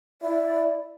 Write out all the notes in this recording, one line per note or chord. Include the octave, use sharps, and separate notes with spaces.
E4 D5